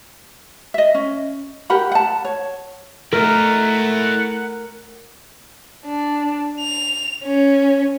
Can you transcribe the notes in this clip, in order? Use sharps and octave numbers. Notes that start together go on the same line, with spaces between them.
D#5 E5
C#4
G4 A#4 F#5 B5
F#5 A5
C#5
A3 E4 A#4 D#5 F#5
D4
F7
C#4